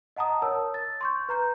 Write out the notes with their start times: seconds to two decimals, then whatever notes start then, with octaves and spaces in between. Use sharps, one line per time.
0.16 D#5 F#5 A5 A#5 D#6
0.42 A#4 C#5 A5 E6
0.74 A6
1.01 C6 C#6 G6
1.29 B4 A#5 G6